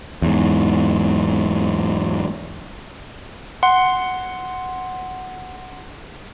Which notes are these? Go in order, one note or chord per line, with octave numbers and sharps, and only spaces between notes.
E2 G#2
F#5 C6